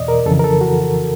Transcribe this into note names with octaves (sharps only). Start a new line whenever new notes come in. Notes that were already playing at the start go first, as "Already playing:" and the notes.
Already playing: E2 B2 D5 D#5
A#4
F2 C#3 E3 A4
A#4
A4
F#4